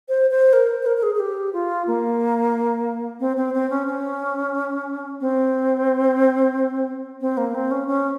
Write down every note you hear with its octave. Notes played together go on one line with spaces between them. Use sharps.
C5
C5
A#4
C5
A#4
A#4
G#4
G#4
G4
F4
A#3
C4
C4
C4
C#4
C#4
C4
C4
A#3
C4
C#4
C#4